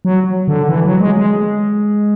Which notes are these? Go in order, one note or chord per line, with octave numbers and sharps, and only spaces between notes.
F#3
D3
E3
F#3
G#3
G#3